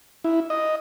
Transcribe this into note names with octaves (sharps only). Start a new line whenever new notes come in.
E4
D#5